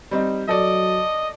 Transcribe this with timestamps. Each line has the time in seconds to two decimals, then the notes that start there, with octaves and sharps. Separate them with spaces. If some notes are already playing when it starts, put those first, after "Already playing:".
0.11 G3 C4 D#4
0.49 F#3 A4 D5 D#5